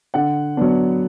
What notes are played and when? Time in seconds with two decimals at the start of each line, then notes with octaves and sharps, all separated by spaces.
0.14 D3 F#5
0.57 F#3 B3 D4